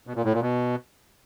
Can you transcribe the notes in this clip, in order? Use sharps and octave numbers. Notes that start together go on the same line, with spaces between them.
B2
A#2
A2
A#2
B2